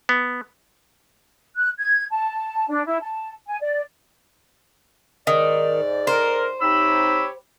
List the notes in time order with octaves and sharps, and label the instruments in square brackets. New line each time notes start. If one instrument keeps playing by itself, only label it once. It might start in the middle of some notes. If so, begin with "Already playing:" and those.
[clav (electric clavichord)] B3
[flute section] F#6
G#6
A5
D4
E4
A5
G#5
D5
[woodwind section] G#2 D5 [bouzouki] D#3
[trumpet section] A#4 [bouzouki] C5
[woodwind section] C3 D#4 [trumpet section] G4 C#5 B5 [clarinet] E6